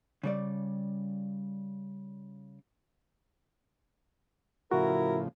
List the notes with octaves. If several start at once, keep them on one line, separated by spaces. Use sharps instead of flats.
C#3 G3 D5
A2 C#3 F3 E4 F#4 A#4